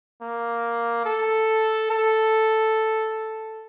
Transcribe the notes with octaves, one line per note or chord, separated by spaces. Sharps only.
A#3
A4
A4